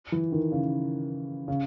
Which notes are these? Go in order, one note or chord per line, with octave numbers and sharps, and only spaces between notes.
E3
D#3
C#3
C#3